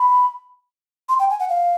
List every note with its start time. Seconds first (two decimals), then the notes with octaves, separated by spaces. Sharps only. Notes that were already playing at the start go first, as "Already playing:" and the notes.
Already playing: B5
1.09 C6
1.19 G5
1.30 G#5
1.40 F#5
1.49 F5